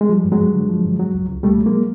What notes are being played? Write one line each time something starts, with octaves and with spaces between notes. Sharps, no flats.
G#3
F3 G3
G2
F#3 G#3
G2
D3
F3
G2
F#3
C#2
C#2
B2 G3 A3
F#3
G#3 A#3